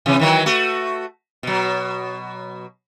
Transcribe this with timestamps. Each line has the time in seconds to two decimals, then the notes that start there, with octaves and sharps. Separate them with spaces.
0.06 C3 E3
0.19 D#3 E3 F#3
0.46 A3 F#4
1.43 B2 F#3